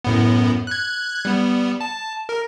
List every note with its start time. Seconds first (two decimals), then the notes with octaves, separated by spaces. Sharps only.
0.05 F#2 A2 B3
0.67 F#6 G#6
1.25 G3 B3
1.81 A5
2.29 A#4